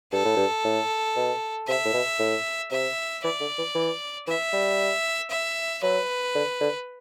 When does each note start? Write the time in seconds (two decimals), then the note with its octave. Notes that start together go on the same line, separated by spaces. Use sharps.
0.13 G2 A4
0.25 A2
0.37 G2
0.64 A2
1.16 B2
1.68 C3 E5
1.85 A2
1.93 B2
2.20 A2
2.71 C3 E5
3.24 E3 D5
3.41 D3
3.58 E3
3.75 E3
4.27 E3 E5
4.53 G3
5.31 E5
5.83 F#3 B4
6.35 D3
6.60 D3